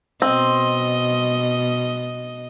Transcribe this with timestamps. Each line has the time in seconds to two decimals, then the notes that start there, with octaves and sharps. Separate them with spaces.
0.22 B2 C4 D#5